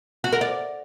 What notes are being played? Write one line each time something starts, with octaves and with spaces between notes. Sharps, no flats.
F#4
A#4
D5